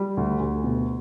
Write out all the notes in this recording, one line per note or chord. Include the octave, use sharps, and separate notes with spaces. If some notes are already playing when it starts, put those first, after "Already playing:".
Already playing: G3
D2
D2
B2